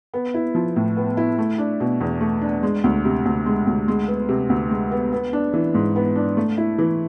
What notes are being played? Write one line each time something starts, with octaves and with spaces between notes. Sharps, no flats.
B3
E4
F3
A2
B3
E4
A3
D4
B2
E2
A3
D4
G#3
D2
C3
D2
G#3
D2
G#3
B3
C3
D2
G#3
B3
B3
D4
E3
G#2
B3
D4
A3
E4
E3